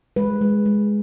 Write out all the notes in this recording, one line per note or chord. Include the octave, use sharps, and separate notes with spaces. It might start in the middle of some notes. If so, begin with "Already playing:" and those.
G#3 B4
G#3
G#3